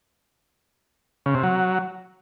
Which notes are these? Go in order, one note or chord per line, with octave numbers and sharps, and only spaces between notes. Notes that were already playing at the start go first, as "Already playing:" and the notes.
C#3
C3
F#3